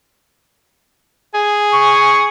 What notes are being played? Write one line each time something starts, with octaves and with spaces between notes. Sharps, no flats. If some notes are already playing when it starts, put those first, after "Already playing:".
G#4
C#6